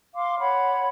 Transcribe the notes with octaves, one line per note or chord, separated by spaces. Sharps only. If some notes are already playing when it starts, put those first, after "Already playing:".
F5 C6 D6
C#5 F#5 B5